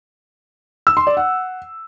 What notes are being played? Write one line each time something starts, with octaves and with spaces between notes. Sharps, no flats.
E6
C6
D5
F#5